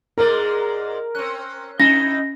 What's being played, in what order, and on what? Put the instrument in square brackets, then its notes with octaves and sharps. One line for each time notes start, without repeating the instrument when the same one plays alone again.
[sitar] G#2 G#3 D5 [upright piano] A#4
[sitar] C4 C#4 [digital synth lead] F#6
[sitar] F#2 D#4 E4 [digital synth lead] C#4 [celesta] A#6